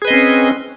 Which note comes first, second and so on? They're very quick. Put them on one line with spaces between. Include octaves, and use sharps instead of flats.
G#4 B4 D#5 C4 C#4